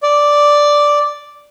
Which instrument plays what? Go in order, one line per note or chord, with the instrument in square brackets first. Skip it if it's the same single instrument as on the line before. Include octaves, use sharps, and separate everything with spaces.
[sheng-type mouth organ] D5